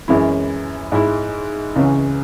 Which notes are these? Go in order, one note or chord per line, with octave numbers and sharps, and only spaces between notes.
F#2 E3 G#3 C#4 E4
G#2 G#3 E4
C#2 C#3 E3 G#3 C#4